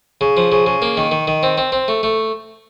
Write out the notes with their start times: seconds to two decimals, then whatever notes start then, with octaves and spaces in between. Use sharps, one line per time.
0.21 C#3
0.37 F3
0.52 C#3
0.66 C#3
0.82 A#3
0.97 D#3
1.11 D#3
1.27 D#3
1.43 C4
1.58 C4
1.72 C4
1.88 A3
2.03 A3